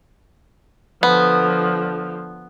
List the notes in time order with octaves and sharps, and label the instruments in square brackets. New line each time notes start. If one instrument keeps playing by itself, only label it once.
[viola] D3 F3 [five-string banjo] B3